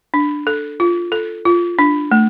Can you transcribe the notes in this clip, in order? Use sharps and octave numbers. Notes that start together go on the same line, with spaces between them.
D4
A4
F4
A4
F4
D4
A3